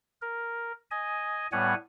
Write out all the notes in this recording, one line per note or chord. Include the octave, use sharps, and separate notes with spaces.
A#4
D#5 G#5
A2 G3 B3 C#5 F#5 G#5